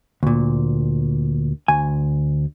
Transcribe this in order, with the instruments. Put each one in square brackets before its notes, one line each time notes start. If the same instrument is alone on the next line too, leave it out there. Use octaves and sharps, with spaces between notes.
[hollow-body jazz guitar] D2 A#2
D2 G#5